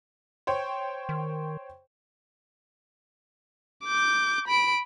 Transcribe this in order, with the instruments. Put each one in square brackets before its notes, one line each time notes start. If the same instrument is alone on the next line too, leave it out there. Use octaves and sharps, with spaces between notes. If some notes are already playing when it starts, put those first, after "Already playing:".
[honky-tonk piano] C5 C#5 G5
[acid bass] D#3
[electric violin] D6 G6
B5 D7